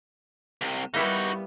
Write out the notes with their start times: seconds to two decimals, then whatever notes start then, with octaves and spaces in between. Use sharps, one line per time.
0.61 C2 C3
0.94 G3 A#3 B3 D#4 E4 F#4 G4